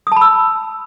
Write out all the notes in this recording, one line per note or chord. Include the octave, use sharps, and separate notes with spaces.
A5 B5 D#6 E6